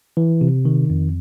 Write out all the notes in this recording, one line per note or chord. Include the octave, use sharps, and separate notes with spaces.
E3
C3
D#3
F2